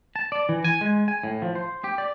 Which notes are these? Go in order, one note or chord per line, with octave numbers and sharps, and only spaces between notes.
A5
D5
E3
G#5
G#3
G#5
A2
F3
C5
G4
D5